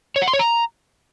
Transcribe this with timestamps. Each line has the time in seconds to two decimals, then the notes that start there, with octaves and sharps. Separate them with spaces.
0.16 C#5
0.22 F#5
0.28 C6
0.33 C#5
0.39 A#5